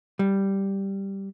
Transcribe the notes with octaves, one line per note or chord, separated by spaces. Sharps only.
G3